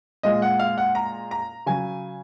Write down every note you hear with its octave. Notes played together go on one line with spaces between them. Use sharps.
A#2 G#3 D#5
F#5
F5
F#5
A#5
A#5
C#3 F#3 G#5